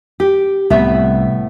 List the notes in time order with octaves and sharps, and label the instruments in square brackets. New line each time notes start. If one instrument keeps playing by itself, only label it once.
[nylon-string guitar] G4
[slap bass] C2 [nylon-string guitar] A2 B3 E5